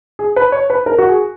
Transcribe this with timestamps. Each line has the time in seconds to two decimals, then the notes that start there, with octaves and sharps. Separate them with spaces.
0.19 G#4
0.36 B4
0.52 C#5
0.70 B4
0.86 A#4
0.98 F#4
1.09 G#4